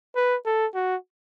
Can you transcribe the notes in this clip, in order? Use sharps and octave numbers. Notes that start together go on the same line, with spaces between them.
B4
A4
F#4